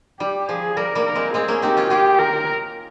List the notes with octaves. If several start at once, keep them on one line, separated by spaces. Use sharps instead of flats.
G3 G4
F3 G#4
G3 A#4
G3 A#3
A#4
G#3 C4
G#3 C4 G#4
A#3 C#4
C4 D#4 G4
C#4 F4
F4 G4 G#4
A#4